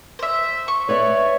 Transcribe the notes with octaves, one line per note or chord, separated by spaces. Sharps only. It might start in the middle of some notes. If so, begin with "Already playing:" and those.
C5 E5
C#6
B4 C#5 D5 E5